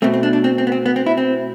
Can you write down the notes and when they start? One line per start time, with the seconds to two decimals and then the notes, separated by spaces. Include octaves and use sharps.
0.02 B2 A3 C4
0.13 C4
0.23 D4
0.33 D4
0.44 C4
0.58 C4
0.67 B3
0.72 C4
0.86 B3
0.96 C4
1.06 E4
1.17 C4